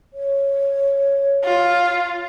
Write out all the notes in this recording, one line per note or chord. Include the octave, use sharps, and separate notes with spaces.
C#5
F4